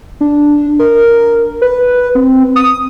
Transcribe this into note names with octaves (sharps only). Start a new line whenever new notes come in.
D4
A#4
B4
C4
D#6